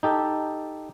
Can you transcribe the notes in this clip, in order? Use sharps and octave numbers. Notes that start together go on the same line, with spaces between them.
D#4 G4 A4